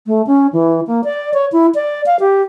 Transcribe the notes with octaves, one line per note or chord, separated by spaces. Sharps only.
A3
C#4
E3
A#3
D5
C#5
E4
D5
F5
G4